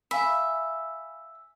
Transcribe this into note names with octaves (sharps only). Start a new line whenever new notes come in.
E5 F5 G#5 B5